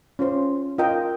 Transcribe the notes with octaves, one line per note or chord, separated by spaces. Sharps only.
C#4 F4 C5
F4 A#4 D#5 G5